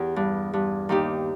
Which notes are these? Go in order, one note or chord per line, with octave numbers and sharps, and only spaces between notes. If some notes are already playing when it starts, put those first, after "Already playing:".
Already playing: E2 G4
G2
G2
D#2 D#4 G4